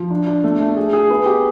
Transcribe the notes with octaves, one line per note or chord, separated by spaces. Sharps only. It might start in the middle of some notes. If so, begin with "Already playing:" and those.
Already playing: F3
D4
D4
A3
A3
G#4
G#4
B3
G4